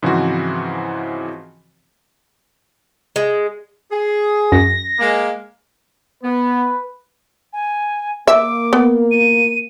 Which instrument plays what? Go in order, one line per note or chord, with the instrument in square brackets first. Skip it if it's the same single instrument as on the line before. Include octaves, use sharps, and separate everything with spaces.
[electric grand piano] G#2 C#3 E3 F3 C4 F#4
[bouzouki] G#3
[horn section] G#4
[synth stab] F#2 [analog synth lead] A#6
[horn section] G#3 A#3
[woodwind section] B3 [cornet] B4
[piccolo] G#5
[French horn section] A#3 [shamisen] E5 [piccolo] D6
[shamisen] B3
[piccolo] D#7